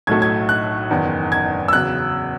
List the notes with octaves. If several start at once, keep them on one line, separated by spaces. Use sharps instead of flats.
B1 A2 F#3 A3 G#6
G#6
F#6
F#1 E2 D#3
G#6
E6
E2 C#3 F#3 F#6